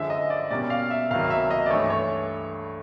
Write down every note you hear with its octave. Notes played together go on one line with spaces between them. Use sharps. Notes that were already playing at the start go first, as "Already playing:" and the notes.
Already playing: F#2 D3 F3 G#3 E5
D#5
D5
B2 G3 A#3 C#4 D5
F5
E5
C#2 C3 D#3 F#3 A#3 F5
E5
D#5
D5
G2 E3 A3 C#5
C#5